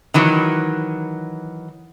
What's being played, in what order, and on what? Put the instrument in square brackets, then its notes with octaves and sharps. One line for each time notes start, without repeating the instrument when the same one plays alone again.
[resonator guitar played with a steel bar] D#3 E3 F#3